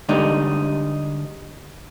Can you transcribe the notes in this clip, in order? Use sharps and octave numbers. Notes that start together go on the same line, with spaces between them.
D3 G3 G#3 D#4